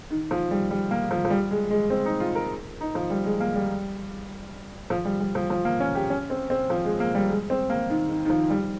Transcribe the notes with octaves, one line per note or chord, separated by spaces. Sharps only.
D#3
F3
G3
G3
A#3
F3
F3
G3
G#3
G#3
C4
D#4
F4
A#4
D#4
F3
G3
G#3
A#3
G3
F3
G3
G3
F3
F3
A#3
C#4
G4
C#4
C4
C4
F3
G#3
A#3
G3
G#3
C4
A#3
D#3
D#3
D#3
F3
G3